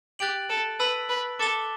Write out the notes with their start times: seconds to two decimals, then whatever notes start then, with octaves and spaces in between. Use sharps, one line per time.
0.19 G4 F#6 A6 D7 F#7
0.50 A4
0.80 B4 A5 E6 B6 F#7
1.09 B4
1.39 A4 D6 A6 E7 G7